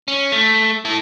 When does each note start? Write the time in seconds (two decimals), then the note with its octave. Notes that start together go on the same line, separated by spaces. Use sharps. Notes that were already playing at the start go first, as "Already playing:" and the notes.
0.08 C#4
0.32 A3
0.85 E4 A4